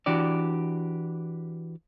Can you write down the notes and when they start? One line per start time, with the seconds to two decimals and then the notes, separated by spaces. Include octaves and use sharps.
0.06 E3 D4 F#4 G4 D5